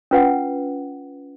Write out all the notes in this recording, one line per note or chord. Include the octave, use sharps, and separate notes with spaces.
C#4 F4 B4 F#5